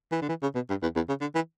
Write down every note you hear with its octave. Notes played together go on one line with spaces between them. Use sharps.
E3
D3
E3
C#3
B2
G2
E2
E2
C#3
D3
E3